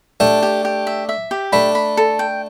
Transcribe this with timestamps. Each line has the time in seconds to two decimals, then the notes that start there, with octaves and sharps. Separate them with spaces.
0.20 A3 D4 G4
0.42 G4
0.65 G4
0.87 E5
1.09 E5
1.31 G4
1.52 A3 D4 B5
1.75 B5
1.97 A4
2.19 G5